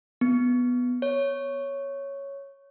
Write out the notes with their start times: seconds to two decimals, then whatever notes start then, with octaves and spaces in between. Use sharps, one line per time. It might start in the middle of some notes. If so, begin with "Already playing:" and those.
0.21 B3
1.02 C#5